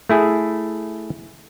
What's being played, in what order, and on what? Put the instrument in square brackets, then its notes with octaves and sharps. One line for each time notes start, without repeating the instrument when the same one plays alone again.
[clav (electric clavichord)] A3 E4 G#4